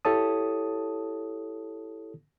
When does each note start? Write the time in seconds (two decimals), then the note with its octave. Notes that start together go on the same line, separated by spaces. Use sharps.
0.05 E4 G4 A4 C#5 A5 D#6